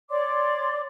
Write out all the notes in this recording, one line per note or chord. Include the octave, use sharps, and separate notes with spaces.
C#5 D5 C6 D6